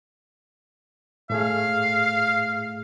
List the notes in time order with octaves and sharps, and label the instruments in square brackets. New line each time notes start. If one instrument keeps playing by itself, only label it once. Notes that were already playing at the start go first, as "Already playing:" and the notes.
[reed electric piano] A2 A3 G#4 [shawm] F5